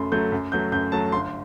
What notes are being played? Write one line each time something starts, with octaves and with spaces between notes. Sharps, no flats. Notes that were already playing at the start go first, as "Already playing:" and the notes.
Already playing: F#2 F#3 A3 B5 C6
F#3 A3 G6
F#2
F#3 A3 G6
F#2 G6
F#3 A3 A5
G1 C6